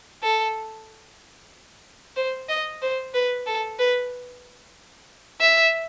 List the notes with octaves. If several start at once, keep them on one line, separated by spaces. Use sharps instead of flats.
A4
C5
D#5
C5
B4
A4
B4
E5